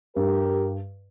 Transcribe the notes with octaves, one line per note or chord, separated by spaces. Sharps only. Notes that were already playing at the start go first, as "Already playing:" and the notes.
G2 G4 A#4